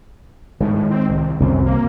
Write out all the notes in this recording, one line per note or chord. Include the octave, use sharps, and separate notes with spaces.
A2 D#3 G#3
A2
C4
C2
C2 F#2 E3 C4
A#3